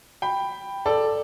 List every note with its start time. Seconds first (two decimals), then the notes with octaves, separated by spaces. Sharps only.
0.22 G5 B5
0.86 A4 D5